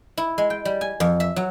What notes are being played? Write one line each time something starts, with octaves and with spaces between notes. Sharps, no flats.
E4
G#3
G5
G3
G#5
F2
E5
F#3